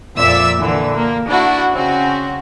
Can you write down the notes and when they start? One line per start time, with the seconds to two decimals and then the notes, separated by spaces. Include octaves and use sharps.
0.16 F2 A#2 D5 E5 E6 B6
0.58 A#2 D3 E3
0.96 A#3
1.28 D4 E4 F#4
1.72 C#3 C4 C#4 F#4